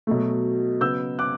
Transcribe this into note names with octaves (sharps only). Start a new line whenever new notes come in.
B2 F#3 A3
C#3 F#3 B3 E6 G6
D6 F#6